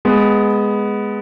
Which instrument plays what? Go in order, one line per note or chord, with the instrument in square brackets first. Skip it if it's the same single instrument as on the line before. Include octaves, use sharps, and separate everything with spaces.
[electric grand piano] G#3 B3